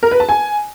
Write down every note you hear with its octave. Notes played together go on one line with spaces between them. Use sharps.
A#4
B4
A5
G#5